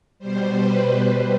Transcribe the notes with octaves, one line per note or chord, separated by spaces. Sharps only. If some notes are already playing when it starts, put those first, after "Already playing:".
B2 G3 C5
B4
C5